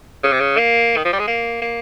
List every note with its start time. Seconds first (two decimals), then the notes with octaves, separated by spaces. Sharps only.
0.24 C#3
0.32 C3
0.40 C#3
0.58 A#3
0.97 D#3
1.05 F3
1.13 G3
1.19 G#3
1.28 A#3
1.62 A#3